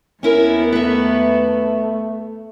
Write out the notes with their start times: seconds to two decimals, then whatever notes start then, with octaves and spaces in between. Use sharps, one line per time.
0.23 D#2 B3 C#4 E4 A#4
0.73 A3 B4 E5